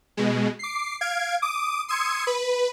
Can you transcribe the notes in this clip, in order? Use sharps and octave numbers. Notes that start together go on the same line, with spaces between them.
B2 G#3
D6 C7
F5 G#6 D7
D6 D#6
C6 D#6 E6 G#6 C#7
B4